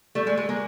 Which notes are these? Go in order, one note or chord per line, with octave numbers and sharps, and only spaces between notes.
G3 A3
G#3
G#3
G#3 A#3